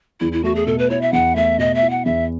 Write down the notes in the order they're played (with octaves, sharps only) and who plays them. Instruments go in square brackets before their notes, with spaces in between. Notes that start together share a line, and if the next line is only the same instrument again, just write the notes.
[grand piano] E2 [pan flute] E4
[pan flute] E4
[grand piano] A3 [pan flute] F#4
[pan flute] G#4
[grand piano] B2 [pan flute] A4
[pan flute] B4
[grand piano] E4 [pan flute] C#5
[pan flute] E5
[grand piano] E2 [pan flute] F#5
[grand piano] A3 [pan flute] E5
[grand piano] B2 [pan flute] D#5
[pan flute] E5
[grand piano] E4
[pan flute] F#5
[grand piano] E2 [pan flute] E5